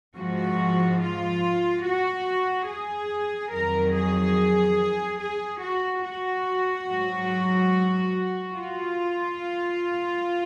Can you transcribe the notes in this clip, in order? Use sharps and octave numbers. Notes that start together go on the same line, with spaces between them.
G#2 F3 F#4
F4
F#4
G#4
F2 D#3 F#3 A#4
G#4
G#4
F#4
F#4
G#2 F#3
F4